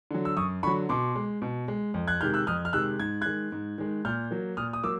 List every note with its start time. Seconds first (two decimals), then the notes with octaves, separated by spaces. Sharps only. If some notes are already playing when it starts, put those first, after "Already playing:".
0.11 D3 F#3
0.25 E6
0.37 F#2 C#6 D#6
0.63 D3 F#3 B5 C#6
0.89 B2 C6 D6
1.16 G#3
1.42 B2
1.68 G#3
1.94 F2
2.08 F#6 G#6
2.21 C3 D#3 G#3 F6 G6
2.34 E6 F#6
2.47 F2 D#6 F6
2.65 F6
2.73 C3 D#3 G#3 E6 F#6
3.00 G#2 G#6
3.21 D#3 G#3 F#6 G#6
3.52 G#2
3.78 D#3 G#3
4.05 A#2 F6 G6
4.31 F#3 A#3
4.57 A#2 D#6 F6
4.73 D#6
4.83 F#3 A#3 D6 E6